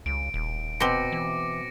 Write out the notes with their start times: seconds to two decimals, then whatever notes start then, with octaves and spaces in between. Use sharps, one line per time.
0.06 C#2 D7
0.34 D#1
0.80 B2 C4 D6 A#6 C#7
1.12 E3